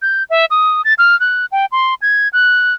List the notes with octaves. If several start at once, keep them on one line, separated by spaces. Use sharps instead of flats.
G6
E5
D#6
A6
F6
F#6
G5
C6
G#6
F#6